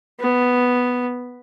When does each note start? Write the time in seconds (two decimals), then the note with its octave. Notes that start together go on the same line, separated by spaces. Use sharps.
0.20 B3